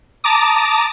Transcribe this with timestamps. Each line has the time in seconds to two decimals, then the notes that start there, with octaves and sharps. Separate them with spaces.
0.24 A5 A#5 D6 D#6